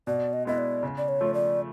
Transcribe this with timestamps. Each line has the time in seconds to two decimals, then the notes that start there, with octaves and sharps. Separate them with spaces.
0.07 B2 D5
0.33 D#5
0.45 G#3 B3 E4 D#5
0.58 D5
0.83 C#3
0.98 D5
1.08 C#5
1.21 F3 A3
1.34 D5